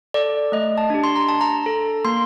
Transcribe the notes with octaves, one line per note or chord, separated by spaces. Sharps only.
A4 D5
A3 D#5
A5
D4 G4
C6
A#5
D4 A5
A#5
A4
A#3 C6